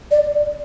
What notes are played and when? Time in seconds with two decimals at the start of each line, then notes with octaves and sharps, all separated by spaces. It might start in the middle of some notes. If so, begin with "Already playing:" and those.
0.11 D5